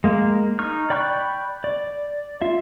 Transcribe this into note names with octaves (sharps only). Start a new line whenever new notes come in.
G#3 A#3
D#4 C#6 F6
D5 G5 B5 C#6 F#6
D5
F4 E5